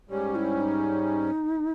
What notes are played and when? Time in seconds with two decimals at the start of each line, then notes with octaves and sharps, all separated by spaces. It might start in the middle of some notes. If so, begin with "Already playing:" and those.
0.09 G#2 G3 C#4 G4
0.35 E4
0.60 D#4